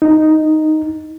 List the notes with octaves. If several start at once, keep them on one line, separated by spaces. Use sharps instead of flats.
D#4